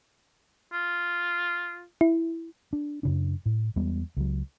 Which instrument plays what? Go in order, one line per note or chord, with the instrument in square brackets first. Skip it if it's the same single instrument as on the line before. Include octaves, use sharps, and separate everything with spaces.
[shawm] F4
[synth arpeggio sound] E4
[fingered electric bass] D4
F#2 C#3 D4
A2
E2 G3 G#3 B3
C#2 F#3